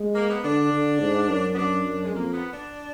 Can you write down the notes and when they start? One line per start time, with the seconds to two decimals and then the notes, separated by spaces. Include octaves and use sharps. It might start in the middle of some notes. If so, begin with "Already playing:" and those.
Already playing: G#3
0.15 A#3
0.30 B3
0.43 D3 D4
0.72 D3
1.00 G#2
1.29 F#2
1.53 B3
1.57 F#2 D4
1.86 F#2
2.04 G#3
2.14 F2 A#3
2.33 B3
2.52 D4